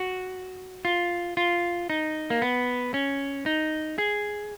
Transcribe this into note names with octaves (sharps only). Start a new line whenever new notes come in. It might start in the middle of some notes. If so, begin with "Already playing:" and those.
Already playing: F#4
F4
F4
D#4
A#3
B3
C#4
D#4
G#4